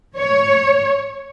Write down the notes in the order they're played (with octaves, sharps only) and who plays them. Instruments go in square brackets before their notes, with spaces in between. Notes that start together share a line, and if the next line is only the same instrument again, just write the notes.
[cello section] C#5